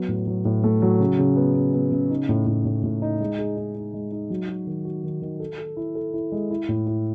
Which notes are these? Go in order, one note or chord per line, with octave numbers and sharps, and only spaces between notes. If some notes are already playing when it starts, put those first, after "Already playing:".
Already playing: F#3 B3
A2
F#3
A2
A3
F#3
C#3
C#3
B3
C#3
B3
C#3
D#4
A2
A2
A2
A2
D#4
G#3
G#4
D#4
D#4
G#3
D#4
F#3
F#4
D#3
F#4
D#3
D#3
A4
A4
E4
A4
E4
G#3
E4
A2
E4